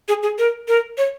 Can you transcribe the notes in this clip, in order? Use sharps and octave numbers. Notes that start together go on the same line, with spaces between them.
G#4
G#4
A#4
A#4
C#5